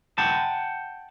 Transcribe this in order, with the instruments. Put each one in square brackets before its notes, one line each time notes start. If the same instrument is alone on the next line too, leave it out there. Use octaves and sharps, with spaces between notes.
[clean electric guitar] F#5 G5 A5